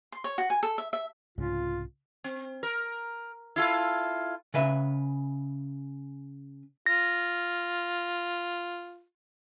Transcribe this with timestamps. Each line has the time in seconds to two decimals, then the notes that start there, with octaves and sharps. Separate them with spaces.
0.12 C6
0.24 C#5
0.38 F#4
0.50 G#5
0.63 A4
0.78 E5
0.93 E5
1.38 C2 G#2 C#3 F4
2.24 C4
2.63 A#4
3.56 E4 F4 A4
4.54 C#3 B4 E5
6.86 F4 A#6